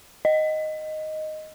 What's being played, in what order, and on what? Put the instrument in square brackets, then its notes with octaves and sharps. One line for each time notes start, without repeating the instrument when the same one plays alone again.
[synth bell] D#5